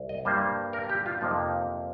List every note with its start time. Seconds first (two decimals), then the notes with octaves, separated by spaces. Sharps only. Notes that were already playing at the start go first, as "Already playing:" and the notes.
Already playing: C2
0.09 D#5
0.25 G2 G3 A#3 C5
0.73 A#4
0.89 G4
1.06 F4
1.21 F2 C3 F3 A#3 D#4